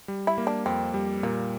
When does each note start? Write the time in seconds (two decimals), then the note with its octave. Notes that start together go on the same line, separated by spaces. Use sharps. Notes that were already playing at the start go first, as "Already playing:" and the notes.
0.08 G3
0.27 E4
0.38 A#3
0.47 D4
0.66 F2 C4
0.94 G3
1.23 A#2 A#3